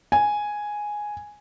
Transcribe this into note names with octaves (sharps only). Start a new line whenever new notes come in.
G#5